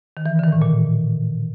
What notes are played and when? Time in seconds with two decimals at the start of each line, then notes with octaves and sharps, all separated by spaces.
0.17 D#3
0.26 E3
0.39 D3
0.44 D#3
0.52 A2
0.62 A#2